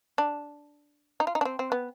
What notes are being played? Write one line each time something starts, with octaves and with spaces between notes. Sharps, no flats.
D4
D#4
F4
D#4
D4
C4
C4
B3